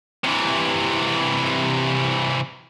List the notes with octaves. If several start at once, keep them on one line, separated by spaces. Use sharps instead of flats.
C3 E3